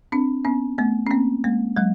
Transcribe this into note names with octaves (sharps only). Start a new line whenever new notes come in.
C4 D4
B3 C#4
A3 B3
C#4
A#3 C4
G#3 A#3
F#3 G#3